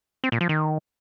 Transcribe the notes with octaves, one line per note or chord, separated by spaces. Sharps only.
C4
A#2
F3
D#3